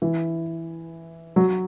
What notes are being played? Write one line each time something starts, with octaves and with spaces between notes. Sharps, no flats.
E3
F#3